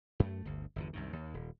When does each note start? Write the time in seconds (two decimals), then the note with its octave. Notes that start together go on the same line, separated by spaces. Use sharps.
0.20 F#2 A3
0.45 G1 D2
0.76 G1 E2 D3
0.93 C2 F#2 D#3
1.13 D#2
1.34 D#1